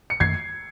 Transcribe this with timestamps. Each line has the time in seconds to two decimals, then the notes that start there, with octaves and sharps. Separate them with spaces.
0.10 C#7
0.20 F#2 D#3 A3 G#6 C7